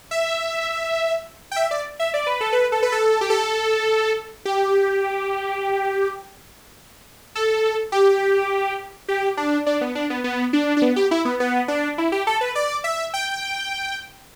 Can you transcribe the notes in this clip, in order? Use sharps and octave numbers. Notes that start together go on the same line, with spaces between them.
E5
G5
E5
D5
E5
D5
B4
A4
B4
A4
B4
A4
G4
A4
G4
A4
G4
G4
D4
D4
B3
D4
B3
B3
D4
D4
B3
G4
E4
B3
B3
D4
E4
G4
A4
B4
D5
E5
G5